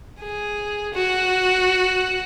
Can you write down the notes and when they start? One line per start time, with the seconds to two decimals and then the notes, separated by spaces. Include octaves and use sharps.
0.20 G#4
0.94 F#4